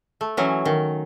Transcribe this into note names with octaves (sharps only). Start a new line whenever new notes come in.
A3
E3 F#3 C#4
D#3